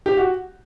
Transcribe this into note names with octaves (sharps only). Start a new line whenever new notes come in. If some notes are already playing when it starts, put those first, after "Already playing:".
G4
F#4